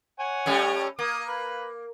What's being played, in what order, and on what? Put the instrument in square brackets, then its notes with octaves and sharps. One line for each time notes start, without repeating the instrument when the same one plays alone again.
[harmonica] C#5 F#5 G#5
[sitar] G3 A3 C#4
[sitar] A#3 [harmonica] D#6
[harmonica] B4